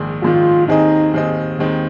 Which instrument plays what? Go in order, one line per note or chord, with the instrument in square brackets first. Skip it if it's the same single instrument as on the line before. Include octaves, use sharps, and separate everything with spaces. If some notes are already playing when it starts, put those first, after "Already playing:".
Already playing: [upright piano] A#1 G#2 D#3
[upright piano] A#1 G#2 D#3 [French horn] F4
[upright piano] D#2 D#3 C4 G#4 D#5 [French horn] D#4
[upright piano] D#2 D#3 C4 G#4 D#5
D#2 D#3 G#3 C4 D#4